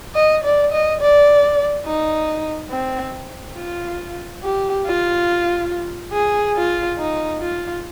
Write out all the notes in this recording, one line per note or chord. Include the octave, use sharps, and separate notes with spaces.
D#5
D5
D#5
D5
D#4
C4
F4
G4
F4
G#4
F4
D#4
F4